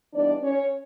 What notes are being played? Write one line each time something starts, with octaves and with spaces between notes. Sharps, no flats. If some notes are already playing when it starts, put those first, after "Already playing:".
E3 G3 B3 D4 D#4 D5
C#4 C#5